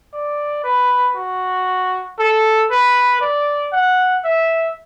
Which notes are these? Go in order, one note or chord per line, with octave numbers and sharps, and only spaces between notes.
D5
B4
F#4
A4
B4
D5
F#5
E5